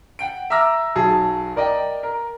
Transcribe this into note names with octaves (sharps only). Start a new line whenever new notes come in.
F#5 G5 D7
E5 A#5 D6 E6 F6 A#6
B1 F#3 G#4 A5
A#4 D5 D#5 G5
A#4